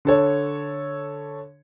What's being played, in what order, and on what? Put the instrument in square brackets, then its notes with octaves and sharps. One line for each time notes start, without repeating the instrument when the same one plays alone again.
[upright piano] D3 A4 C#5